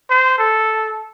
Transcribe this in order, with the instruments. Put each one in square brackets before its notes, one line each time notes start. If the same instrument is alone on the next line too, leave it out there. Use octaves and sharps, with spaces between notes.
[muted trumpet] C5
A4